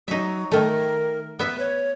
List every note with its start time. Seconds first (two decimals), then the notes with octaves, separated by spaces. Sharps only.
0.08 F#3 D#4 E5
0.51 D#3 A3 A#4
1.39 B3 B4 E5
1.59 C#5